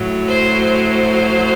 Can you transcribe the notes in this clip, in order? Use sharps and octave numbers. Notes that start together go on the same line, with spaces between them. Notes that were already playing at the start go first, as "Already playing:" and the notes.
Already playing: A2 F#3
C5
C5